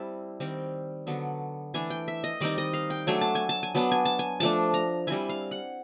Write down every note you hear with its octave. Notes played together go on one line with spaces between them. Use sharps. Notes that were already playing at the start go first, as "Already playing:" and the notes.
Already playing: G3 C4 E4 A5
D#3 G3 C4
D3 F#3 B3
E3 A3 D4 G#5
G5
E5
D#5
D#3 G3 C4 D#4 D5
D#5
F5
G5
F#3 A3 D4 G#5
A5
G#5
A5
G#5
F#3 B3 D4 A5
G#5
A5
G#5
F3 A3 D4 A5
A#5
G3 C4 E4 G#5
F5
F#5